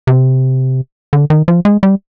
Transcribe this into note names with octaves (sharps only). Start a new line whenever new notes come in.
C3
D3
D#3
F3
G#3
G3